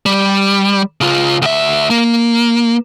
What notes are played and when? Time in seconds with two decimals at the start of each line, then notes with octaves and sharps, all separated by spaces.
0.06 G3
1.01 C#3 F4
1.42 D2 E5
1.90 A#3